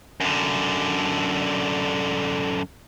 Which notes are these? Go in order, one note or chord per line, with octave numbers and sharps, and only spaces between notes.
F#2 D3